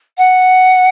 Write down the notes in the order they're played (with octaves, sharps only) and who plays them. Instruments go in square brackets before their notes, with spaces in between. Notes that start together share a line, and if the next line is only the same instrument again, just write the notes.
[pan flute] F#5